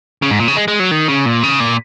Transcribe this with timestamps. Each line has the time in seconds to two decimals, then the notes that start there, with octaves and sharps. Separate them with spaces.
0.22 C#3
0.31 G#2
0.39 A#2
0.48 C#3
0.57 G#3
0.68 G#3
0.80 F#3
0.91 D#3
1.08 C#3
1.26 A#2
1.43 C#3
1.60 A#2